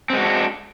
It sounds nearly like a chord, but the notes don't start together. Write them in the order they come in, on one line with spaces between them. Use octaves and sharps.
C4 G#3 F#4 D4